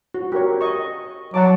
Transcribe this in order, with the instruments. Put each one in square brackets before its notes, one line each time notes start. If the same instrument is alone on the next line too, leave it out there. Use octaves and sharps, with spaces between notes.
[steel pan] F#4
G4 A#4 C#5
D#5 C#6
[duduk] F#3 [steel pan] F#5 A5 D6